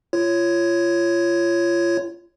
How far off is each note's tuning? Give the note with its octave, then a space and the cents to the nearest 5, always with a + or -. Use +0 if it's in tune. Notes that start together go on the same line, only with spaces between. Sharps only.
F4 -30 C#5 +0